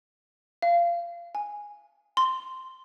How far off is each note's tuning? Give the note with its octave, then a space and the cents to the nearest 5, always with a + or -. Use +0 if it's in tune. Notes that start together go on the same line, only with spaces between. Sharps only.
F5 -20
G#5 -5
C6 -5